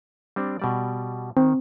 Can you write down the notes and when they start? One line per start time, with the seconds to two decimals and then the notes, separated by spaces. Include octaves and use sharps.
0.36 G3 C4 D4
0.59 B2 G3 D5
1.37 D#3 C4